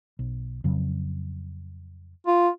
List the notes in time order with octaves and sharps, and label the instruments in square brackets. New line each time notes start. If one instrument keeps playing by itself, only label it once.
[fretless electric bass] B1
F2 C#3 F#3
[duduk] F4